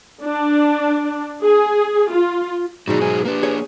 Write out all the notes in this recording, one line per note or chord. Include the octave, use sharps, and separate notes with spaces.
D4
G#4
F4
G#2 B2 F#3 D#4 F#4 G#4 D5
D#4 F#4 C5 G#5
A#3 D4 G4 B4
G#4 C#5